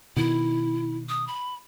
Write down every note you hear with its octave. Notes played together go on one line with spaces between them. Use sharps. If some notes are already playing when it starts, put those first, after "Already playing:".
B2 D#3 E4
D#6
B5